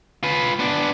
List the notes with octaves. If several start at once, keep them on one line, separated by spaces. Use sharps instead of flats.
F4 B4
B3 D4